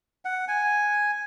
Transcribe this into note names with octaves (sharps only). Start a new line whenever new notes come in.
F#5
G#5